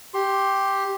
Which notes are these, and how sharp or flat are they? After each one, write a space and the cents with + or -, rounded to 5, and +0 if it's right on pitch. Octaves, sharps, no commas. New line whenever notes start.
G4 +0 C6 +20